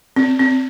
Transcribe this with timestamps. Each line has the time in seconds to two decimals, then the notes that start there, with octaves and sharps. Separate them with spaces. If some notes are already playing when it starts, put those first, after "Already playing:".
0.16 C4
0.40 C4